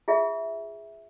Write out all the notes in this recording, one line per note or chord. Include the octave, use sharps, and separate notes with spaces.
F4 G#4 E5